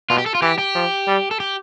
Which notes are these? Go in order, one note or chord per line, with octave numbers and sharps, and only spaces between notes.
B2 F4
G4
A4
F4
E3 G4
G4
F3
G3
A4
G4